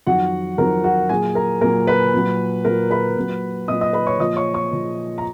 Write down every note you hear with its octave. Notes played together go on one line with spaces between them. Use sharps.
F2 D#3 F#3 F#4 F#5
F2 D#3 F#3 A#4 A#5
F#4 F#5
A#2 F#3 G#4 G#5
A#4 A#5
A#2 F#3 A#4 A#5
B4 B5
A#2 F#3
A#2 F#3 A#4 A#5
B4 B5
A#2 F#3
A#2 F#3 D#5 D#6
D#5 D#6
B4 B5
C#5 C#6
A#2 F3 D#5 D#6
C#5 C#6
C#5 C#6
A#2 F3
A#5